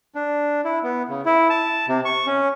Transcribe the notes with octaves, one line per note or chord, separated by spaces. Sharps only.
D4
E4
B3
C#3
E4
A5
C3
C#6
C#4